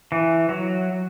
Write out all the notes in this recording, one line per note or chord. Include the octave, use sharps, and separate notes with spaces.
E3
F#3